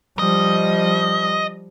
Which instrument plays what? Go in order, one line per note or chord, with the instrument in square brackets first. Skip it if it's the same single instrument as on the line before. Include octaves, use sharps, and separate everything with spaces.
[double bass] F3 G3 [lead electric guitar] D#5